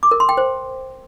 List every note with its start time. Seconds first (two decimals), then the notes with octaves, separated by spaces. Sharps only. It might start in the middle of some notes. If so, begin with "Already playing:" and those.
0.03 D6
0.11 A#4
0.20 C6
0.29 G5
0.37 C5